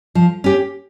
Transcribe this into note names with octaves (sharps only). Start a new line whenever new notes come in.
F3
C#4 G4